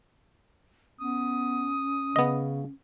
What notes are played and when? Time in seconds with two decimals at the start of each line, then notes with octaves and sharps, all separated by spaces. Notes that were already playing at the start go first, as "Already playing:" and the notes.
1.00 B3 C#4 D#6
2.16 C#3 B3 D#5